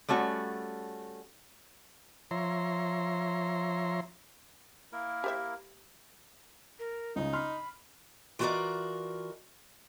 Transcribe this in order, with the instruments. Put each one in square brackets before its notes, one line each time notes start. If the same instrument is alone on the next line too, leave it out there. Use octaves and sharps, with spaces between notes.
[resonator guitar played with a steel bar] G3 A3 C#4 F#4
[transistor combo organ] F3 C#5 E5 A#5 C6
[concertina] A#3 E4 A#4
[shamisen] G4 C5 E5
[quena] A#4
[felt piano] C#2 C#3 [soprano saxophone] D#4
[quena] B5 [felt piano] C6 F6
[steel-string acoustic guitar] E3 F4 F#4 A4 A#4 D5